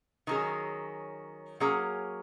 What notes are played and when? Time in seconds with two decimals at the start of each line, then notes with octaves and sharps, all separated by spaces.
0.27 D#3 F#3 C#4 G#4
1.60 F#3 A#3 C#4 G#4